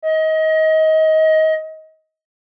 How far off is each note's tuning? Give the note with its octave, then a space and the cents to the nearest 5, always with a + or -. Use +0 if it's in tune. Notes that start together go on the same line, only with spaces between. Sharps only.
D#5 +25